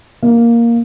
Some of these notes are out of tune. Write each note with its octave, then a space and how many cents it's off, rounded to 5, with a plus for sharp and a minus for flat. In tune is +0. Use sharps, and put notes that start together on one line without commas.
A#3 +5